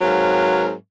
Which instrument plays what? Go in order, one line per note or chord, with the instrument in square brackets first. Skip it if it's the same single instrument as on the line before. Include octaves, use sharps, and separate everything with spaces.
[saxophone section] G#2 F#3 C4 A#4 B4 F5